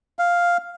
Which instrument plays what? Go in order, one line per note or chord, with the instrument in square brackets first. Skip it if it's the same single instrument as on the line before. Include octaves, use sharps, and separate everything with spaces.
[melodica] F5